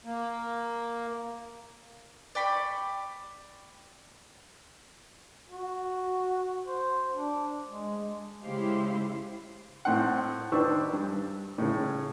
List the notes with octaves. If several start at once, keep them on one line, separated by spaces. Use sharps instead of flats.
A#3
D5 G5 B5 C#6
F#4
C5
D4
G#3
C#3 G#3 E4 G4 C5 F5
A2 C4 F#5
D#3 D4 B4 C5 C#6 E6
G2
A2 C#3